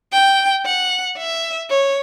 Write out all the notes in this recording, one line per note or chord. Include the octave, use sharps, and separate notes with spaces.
G5
F#5
E5
C#5